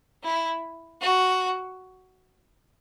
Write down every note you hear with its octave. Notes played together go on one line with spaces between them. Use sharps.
E4
F#4